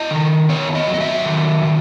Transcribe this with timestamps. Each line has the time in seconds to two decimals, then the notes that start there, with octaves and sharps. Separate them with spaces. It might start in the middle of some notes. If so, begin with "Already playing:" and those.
Already playing: E4 D#5
0.11 D#3
0.49 B3 C#5
0.75 D#5
0.87 F#3
0.94 D#5
1.00 E5
1.25 D#3
1.65 D#3